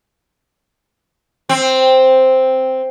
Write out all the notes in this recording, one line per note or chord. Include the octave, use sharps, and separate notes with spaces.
C4